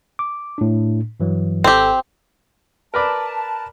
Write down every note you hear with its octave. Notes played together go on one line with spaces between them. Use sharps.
D6
A2 D4
G2 E3 F#3
G#1 C4 G4 A4
A#4 B4 D5 A5